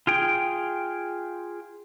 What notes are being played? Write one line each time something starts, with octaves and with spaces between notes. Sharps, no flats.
F4 G#4 G5